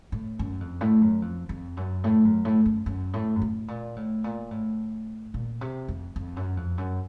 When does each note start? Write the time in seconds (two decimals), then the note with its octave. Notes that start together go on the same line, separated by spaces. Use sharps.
0.12 A2
0.39 F#2
0.61 F2
0.81 A2
1.02 F#2
1.22 F2
1.49 F2
1.77 F#2
2.04 A2
2.25 F#2
2.45 A2
2.65 F#2
2.86 F#2
3.14 A2
3.36 F#2
3.42 A2
3.68 A#2
3.96 A2
4.24 A#2
4.51 A2
5.34 A#2
5.61 C3
5.88 F2
6.16 F2
6.36 F#2
6.57 F2
6.78 F#2